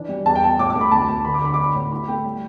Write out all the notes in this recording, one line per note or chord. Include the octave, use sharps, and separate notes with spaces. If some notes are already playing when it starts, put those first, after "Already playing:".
Already playing: E3 D4
G3
E2 A5
G5
B2 A5
A2 D6
D6
A3
B5
D2 A5
D2
D3 B5
D6
D3 B5
D6
D4
B5
A2
E4 B5
A3 G5
G3